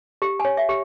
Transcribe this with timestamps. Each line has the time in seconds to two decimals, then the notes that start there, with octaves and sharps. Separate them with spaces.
0.22 G4
0.40 G#5
0.45 C#5
0.57 E5
0.69 G4